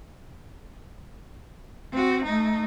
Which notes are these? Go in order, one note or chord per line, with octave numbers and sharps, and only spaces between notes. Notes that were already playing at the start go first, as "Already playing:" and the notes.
C4 F#4
A3 D#4